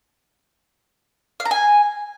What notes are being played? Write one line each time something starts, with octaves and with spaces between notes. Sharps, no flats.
F5
A#5
G#5